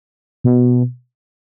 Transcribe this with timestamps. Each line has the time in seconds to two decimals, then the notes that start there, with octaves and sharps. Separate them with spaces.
0.44 B2